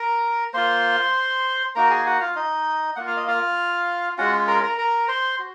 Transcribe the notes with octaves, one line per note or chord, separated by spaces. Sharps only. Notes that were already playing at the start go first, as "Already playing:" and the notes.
Already playing: A#4 A#5
A#3 F4 C5 C6
A#3 D#4 F#4 A#4 A#5
G#4 G#5
F#4 F#5
F4 F5
D#4 D#5
A#3 F4 F#5
F5
D#5
F4 F5
G#3 C#4 F4 F#4 F#5
A#4 A#5
A#4 A#5
A#4 A#5
C5 C6
F#4